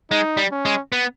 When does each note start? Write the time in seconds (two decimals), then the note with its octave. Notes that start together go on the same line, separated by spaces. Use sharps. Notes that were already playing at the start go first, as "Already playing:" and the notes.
0.11 G#3 D#4
0.37 G3
0.52 C#4
0.65 G#3
0.92 B3